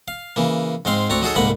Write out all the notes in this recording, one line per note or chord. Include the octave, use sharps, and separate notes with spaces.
F5
C#3 E3 A#3
G#2 G#3 C4 F5 C6
D2 C4 D4 A#5 C#6
F#3 D#4 F#4 G#4 A4 C#5
C2 G#2 D3 A#3 F#5 B5